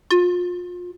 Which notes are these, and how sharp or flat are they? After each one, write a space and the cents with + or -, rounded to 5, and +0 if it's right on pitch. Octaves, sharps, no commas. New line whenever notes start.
F4 +30